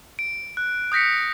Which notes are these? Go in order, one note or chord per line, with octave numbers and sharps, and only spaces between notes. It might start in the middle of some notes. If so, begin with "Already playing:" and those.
D7
F#6
D#6 G6 A#6 B6 C#7